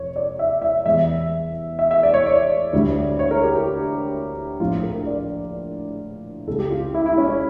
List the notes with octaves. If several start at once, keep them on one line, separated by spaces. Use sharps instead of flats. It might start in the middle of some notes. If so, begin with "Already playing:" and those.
Already playing: F1 C#5
D5
E5
E5
E2 E3 G3 E5
E5
E5
D5
C#5
D5
D2 D3 G3
C#5
A#4
G4
G4
A#1 A2 F3 F4
A#4
D5
C#2 C#3 G3 A4
G4
F4
E4
E4
C#4
C#4